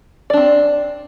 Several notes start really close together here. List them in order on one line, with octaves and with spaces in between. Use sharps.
D5 D4 C4